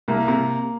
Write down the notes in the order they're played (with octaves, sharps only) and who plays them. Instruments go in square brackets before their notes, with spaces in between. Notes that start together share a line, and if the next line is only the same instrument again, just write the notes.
[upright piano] C2 [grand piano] A#3
[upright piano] C3